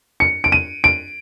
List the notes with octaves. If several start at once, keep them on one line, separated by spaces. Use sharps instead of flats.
C#7
D7
D#7
D7